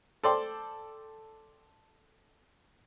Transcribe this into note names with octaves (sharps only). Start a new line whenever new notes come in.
A4 C5 D5 G5 C6